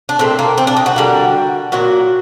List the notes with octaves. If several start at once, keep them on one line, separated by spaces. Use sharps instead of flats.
D4
A#2 A3 C4
A#3
C4
D4
D#4
F#4
D3 G3 A#3
A#2 F#3 A#3 F#4